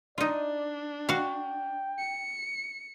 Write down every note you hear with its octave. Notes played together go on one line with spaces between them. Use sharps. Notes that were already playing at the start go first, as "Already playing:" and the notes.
D4 D#4 F4 D5
F#4 F5 G5
C#7